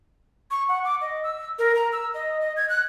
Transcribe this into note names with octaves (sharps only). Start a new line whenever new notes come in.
C#6
F#5
D6
D#5
E6
A#4
A#5
E6
D#5
D#5
G#6
F#6